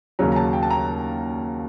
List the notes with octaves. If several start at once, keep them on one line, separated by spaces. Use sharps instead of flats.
D#2 C#3 F#3 A#5
A#5
A5
G5
A5
A#5